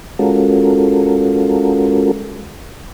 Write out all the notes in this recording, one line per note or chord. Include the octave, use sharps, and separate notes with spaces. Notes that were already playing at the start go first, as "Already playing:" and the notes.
G#3 C#4 F4 F#4 A4 A#4